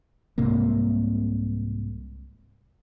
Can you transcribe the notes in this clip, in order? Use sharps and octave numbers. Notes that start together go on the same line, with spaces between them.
C2 G#2 C3 A#3